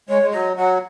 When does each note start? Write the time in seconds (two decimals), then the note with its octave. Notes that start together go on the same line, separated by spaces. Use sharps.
0.09 G#3 C#5
0.22 G#3
0.32 F#3 D#5
0.57 F#3 F#5